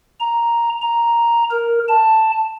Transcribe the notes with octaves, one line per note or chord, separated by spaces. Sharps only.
A#5
A#5
A#4
A5